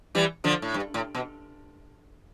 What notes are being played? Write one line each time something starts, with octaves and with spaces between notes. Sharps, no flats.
E3 G3
D3 F3
A2
G2
A2
B2